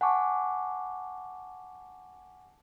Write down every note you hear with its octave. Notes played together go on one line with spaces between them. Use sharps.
F#5 G#5 A5 C#6 D6